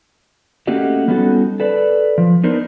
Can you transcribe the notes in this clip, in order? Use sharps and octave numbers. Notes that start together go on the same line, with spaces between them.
A3 A#3 C#4 F#4 G4 D#5
G3 B3 C#4 D#4 F#4 A4
A4 B4 D5
F3
B3 D4 D#4 A#4 C5